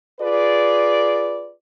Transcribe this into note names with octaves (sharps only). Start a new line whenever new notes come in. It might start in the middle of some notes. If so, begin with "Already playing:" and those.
F4 G#4 B4 D5